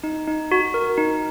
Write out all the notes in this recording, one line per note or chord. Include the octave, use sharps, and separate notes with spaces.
D#4
D#4
F#4
A#4
D#4